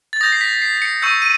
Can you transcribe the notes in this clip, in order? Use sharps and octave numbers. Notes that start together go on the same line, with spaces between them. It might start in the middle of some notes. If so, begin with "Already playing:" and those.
A6
D#6 G6 A#6
C7
B6
C7
C7
C#7
C#6 E6 G6 C#7
D#7